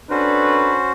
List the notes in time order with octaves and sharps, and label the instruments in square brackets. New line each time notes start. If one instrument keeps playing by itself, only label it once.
[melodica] C#4 F#4 C5 [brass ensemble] D4 A4 B4